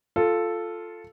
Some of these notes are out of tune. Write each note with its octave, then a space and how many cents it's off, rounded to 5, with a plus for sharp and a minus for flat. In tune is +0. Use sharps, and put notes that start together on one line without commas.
F4 +0 A4 +0